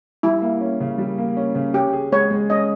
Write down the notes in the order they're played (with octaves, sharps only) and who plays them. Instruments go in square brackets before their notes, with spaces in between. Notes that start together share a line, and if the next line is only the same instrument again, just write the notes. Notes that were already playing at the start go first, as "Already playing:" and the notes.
[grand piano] G3 [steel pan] E4
[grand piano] A#3
C#4
C#3
G3
A#3
C#4
C#3
[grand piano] C#4 [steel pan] G4
[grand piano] G#4
[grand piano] G#3 [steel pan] C#5
[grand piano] G#3
[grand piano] C#4 [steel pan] D#5